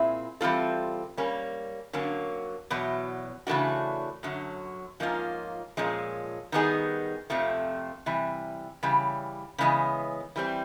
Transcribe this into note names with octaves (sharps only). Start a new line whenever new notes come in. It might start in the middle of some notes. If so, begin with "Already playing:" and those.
Already playing: A#2 C4 E4 G#4
E3 G3 C4 F4 A4
G3 A#3 C#4
D3 F#3 A#3 C#4
E2 B2 F#3
C#3 E3 A3 D4 F#4
F#2 D3 F#3
G#2 F3 A#3 C#4 F4
A#2 F3 G#3 C#4
D#3 G3 B3 D#4 G#4
F2 C3 F3 A3
C3 E3 G3
C#3 E3 G3
C#3 E3 G#3 B3
E3 G3 C4